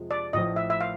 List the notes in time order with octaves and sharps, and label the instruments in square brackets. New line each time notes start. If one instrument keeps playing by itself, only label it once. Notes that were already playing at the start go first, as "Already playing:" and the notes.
Already playing: [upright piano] F2 C3 F3 G#3
[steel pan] D5
[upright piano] A1 A2 F3 [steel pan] D#5
[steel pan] E5
E5
F5